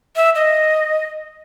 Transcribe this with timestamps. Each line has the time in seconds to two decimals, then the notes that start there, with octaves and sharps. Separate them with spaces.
0.16 E5
0.35 D#5